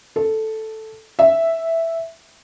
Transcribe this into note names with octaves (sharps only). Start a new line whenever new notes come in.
A4
E5